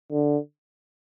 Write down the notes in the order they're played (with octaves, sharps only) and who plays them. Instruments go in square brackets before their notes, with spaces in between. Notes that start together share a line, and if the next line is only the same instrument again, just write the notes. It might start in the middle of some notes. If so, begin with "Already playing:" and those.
[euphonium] D3